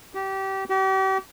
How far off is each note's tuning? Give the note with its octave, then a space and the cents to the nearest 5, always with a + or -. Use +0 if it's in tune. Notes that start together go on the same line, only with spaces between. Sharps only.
G4 -25
G4 -40